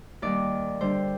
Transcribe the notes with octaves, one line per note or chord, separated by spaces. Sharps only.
D#2 D#3 G3 A#3 D5
D3 G3 D4 C5